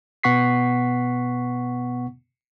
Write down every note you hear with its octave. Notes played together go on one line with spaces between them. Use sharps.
B2 B3 F#5 C#6 B6 C7